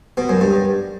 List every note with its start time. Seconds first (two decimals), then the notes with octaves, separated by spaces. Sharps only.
0.17 B2
0.29 F#2
0.41 G2